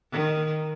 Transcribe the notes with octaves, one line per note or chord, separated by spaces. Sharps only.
D#3